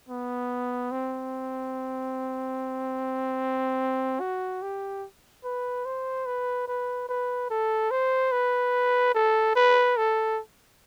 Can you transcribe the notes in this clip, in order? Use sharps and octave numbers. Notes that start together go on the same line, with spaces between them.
B3
C4
F#4
G4
B4
C5
B4
B4
B4
A4
C5
B4
A4
B4
A4